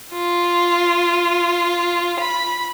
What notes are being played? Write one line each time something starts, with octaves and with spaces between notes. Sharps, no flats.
F4
B5